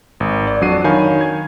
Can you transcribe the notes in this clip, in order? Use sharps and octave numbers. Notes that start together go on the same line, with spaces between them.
G#1
D5
F2 F#3 D4 F#4 C7 D#7
D#3 C#5 F5 G#5 B5 G6
G#6